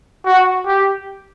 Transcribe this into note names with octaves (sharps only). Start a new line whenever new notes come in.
F#4
G4